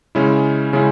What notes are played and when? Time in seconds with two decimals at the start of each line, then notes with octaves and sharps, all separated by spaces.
0.15 C#3 G#3 C#4 E4
0.73 C#3 G#3 C#4 E4